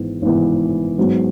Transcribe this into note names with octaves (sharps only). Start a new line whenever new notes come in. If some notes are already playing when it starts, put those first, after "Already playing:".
Already playing: G#1 G#2 E3 B3
G#1 G#2 E3 B3
G#2 F#3 B3